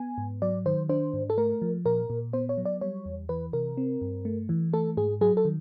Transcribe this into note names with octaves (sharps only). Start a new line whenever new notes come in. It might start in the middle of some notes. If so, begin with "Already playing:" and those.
Already playing: B3 G#5
G#2
F#3 D5
D#3 C5
D4 C5
G#2
A4
A3 A#4
F3
A#2 A#4
A#2
B3 C5
C#5
F#3
D5
G3 C#5
E2
E3 B4
C3 A#4
C4
G2
A3
E3
A3 A4
G#2 G#4
F#3 G#4
A4
D#3